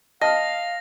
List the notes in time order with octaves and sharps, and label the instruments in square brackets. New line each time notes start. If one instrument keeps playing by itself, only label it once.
[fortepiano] D#5 [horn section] F5 [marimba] A5 [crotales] A#6